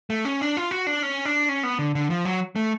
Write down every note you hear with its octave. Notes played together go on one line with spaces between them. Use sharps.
A3
C#4
D4
F4
F#4
D4
C#4
D4
C#4
B3
D3
D3
F3
F#3
A3